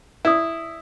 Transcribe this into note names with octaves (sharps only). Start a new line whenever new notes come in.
E4 D5 D#6